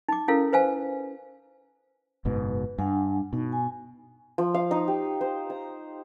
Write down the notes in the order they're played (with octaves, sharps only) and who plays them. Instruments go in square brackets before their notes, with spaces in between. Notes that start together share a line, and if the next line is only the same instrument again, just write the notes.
[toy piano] D#4 D6
C#4 E4 A4 A#4 F5
B4 C5 F5 G#5
[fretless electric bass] F#1 G#2 B2 [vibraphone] B4
[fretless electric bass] G2 [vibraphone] D4 F#5 G#5
[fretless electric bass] B2 [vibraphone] D#4
[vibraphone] G#5
[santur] F3
F5
D#4
G4
C5
A#5